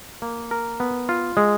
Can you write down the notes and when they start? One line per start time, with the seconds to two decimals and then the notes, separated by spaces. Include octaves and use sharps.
0.22 A#3
0.51 A#4
0.80 B3
1.09 F4
1.37 G#3